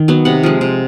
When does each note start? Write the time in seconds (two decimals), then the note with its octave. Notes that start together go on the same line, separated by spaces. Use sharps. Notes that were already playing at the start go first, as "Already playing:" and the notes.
Already playing: D#3
0.08 F#3 B3
0.25 C3 F#5
0.43 F3 G#3
0.61 C3